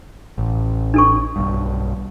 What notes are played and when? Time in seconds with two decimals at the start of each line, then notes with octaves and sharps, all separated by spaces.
0.38 A1
0.94 D4 A4 C#6
1.36 B1 G2